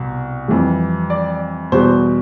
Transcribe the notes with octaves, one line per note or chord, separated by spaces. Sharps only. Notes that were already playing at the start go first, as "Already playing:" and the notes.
Already playing: C2 B2
F2 E3 G3
D5
E2 B2 G3 C5